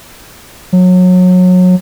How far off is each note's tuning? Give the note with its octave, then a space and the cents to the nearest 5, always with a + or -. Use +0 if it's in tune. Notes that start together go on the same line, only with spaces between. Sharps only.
F#3 -25